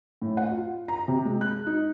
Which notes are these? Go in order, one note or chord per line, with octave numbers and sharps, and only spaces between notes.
A2
F#5
F4
A#5
C3
G#3
F#6
D#4